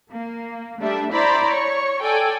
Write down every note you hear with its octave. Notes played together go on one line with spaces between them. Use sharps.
A#3
G3 A3 D4 E5
E4 C5 D5 A#5 B5
C#5 C#6
A4 D5 G5 G#5